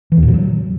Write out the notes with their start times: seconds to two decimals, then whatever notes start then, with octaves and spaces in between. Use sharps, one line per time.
0.12 E3
0.17 E2
0.23 A#2
0.28 C#3
0.34 F#3